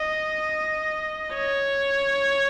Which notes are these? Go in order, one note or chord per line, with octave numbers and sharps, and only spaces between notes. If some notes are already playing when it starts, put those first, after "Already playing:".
Already playing: D#5
C#5